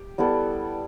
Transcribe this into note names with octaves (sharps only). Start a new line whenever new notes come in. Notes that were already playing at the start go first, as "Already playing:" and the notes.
Already playing: G4
G3 B3 E4 A4